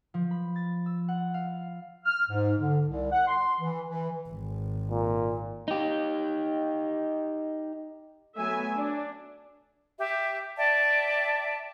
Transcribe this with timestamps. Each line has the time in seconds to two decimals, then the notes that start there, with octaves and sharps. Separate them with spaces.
0.14 F3
0.31 B5
0.56 A6
0.86 E6
1.08 F#5
1.34 F5
2.05 F6
2.30 G#2
2.58 D3
2.87 C2
3.12 F#5
3.27 C6
3.60 E3
3.89 E3
4.29 G#1
4.90 A#2
5.68 D#4 G4
8.38 F#3 A3 B3 E5 G#5
8.77 D4
9.99 G4 E5
10.57 D5 E5 G5 A5